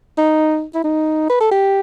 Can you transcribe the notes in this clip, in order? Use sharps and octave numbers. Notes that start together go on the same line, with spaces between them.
D#4
E4
D#4
B4
A4
G4